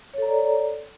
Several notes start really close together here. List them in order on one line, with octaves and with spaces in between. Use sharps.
C#5 A4 A#5 D5